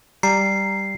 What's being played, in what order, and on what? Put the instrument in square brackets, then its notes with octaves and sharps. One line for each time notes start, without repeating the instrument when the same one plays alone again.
[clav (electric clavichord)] G3 [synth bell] A#5 [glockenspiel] C7